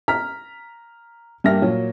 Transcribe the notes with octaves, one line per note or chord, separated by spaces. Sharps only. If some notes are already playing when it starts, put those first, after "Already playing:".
A#5 F6 B6
G2 G3 A#3 E5 F6 A#6
A#2 F#3